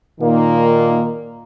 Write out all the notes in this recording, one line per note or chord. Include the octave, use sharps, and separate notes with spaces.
A#2 D#3 A#3